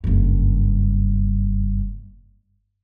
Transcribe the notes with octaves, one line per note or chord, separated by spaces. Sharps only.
F#1 G2